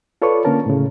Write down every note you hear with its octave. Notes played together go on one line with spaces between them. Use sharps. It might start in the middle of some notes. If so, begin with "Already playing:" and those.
F4 A4 B4 C#5 D5 C#6
D3 A#3 C#4 A#4 A5
A2 C#3